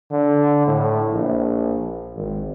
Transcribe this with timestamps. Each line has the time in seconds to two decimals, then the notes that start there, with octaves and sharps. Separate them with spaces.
0.11 D3
0.67 A2
1.12 A#1
2.16 G#1